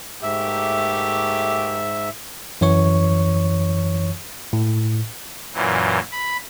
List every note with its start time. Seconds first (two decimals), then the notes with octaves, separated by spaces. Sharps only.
0.23 G#2 A3 A#3 G4 E5
2.61 F#2 E3 C#5 C#6
4.53 A2
5.54 F#2 A#2 E3
6.11 B5